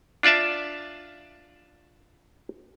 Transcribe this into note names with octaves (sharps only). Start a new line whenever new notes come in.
D4 F4 D5 E5 A5